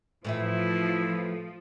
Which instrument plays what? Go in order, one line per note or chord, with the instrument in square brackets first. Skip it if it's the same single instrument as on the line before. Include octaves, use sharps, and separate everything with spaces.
[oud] A2 E3 E5 [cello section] F3 [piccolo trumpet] E4 [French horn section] B4